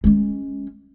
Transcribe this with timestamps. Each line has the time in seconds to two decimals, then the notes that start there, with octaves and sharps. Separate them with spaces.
0.04 G#3 C#4